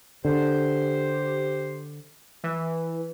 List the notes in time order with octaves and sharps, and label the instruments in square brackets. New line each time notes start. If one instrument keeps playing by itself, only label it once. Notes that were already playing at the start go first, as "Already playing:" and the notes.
[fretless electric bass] D3 [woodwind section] G4 C5
[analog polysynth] E3